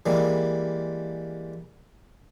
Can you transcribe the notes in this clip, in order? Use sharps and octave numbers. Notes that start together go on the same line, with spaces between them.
E3 G3 G#3 A#3